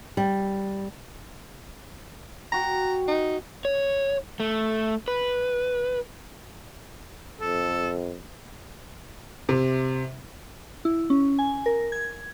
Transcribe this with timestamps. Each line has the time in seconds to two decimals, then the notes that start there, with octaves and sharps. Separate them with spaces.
0.17 G3
2.52 F#4 G5 A#5
3.08 D#4
3.65 C#5
4.40 A3
5.08 B4
7.41 F2 A4
9.49 C3
10.85 E4
11.10 C#4
11.39 G#5
11.66 A#4
11.92 G#6